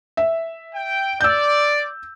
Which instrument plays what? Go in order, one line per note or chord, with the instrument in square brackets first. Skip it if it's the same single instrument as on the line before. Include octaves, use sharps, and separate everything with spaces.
[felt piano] E5
[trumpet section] G5
[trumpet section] D5 [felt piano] E6 G6